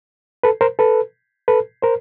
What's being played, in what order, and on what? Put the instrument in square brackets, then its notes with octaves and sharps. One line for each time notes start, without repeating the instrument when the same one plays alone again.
[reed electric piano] A4 B4
A#4 C5
A4 B4
A4 B4
A#4 C5